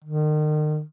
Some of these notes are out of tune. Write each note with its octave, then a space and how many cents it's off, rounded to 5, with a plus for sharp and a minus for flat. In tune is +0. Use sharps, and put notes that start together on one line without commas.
D#3 -35